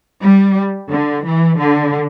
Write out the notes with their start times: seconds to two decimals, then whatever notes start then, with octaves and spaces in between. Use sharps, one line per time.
0.22 G3
0.91 D3
1.25 E3
1.59 D3